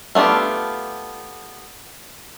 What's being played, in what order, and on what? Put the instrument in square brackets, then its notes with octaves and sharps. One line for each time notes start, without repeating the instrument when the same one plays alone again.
[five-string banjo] A3 B3 D4 F4 G4